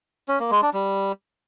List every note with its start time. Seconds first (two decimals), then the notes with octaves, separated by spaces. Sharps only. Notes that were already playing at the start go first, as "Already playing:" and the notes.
0.28 C#4
0.40 A#3
0.51 G#3
0.62 D4
0.73 G3